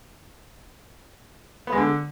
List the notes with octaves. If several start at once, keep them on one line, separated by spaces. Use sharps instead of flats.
B3
G#3
D3